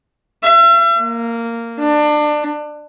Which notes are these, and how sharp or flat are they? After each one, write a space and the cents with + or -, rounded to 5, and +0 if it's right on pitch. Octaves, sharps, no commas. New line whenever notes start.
E5 +40
A#3 -10
D4 +25